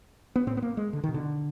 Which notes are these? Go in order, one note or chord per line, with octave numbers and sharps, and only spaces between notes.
B3
A2 C4
B3
A#3
G#3
D3
B2 D#3
D3